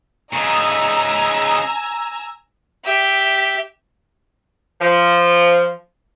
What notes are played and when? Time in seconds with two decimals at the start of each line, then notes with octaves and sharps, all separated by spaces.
0.33 C#3 D#4 G#5 A#5 E6
2.85 G4 E5
4.82 F3